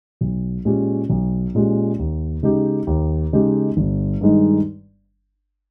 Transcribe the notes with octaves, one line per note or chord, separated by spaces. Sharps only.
B1
A#2 G#3 C#4 G4
B1
A#2 G#3 C#4 G4
D#2
C#3 G#3 D#4 G4
D#2
C#3 G#3 D#4 G4
G1
G2 D#3 G#3 D#4